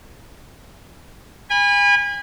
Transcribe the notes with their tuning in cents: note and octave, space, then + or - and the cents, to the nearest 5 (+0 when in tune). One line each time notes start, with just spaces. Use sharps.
G#5 -35 B5 -10